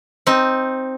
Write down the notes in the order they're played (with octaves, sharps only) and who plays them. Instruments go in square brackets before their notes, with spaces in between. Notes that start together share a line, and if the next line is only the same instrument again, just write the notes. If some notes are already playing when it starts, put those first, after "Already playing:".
[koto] C4 D#4